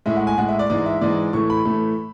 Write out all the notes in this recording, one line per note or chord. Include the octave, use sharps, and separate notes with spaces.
A2 G#3 E5
F#5
G#5
A2 G#3 F#5
E5
D5
G#2 E3 G#3 D5
E5
G#2 E3 G#3 D5
A2 E3 A3 C#6
B5
A2 E3 A3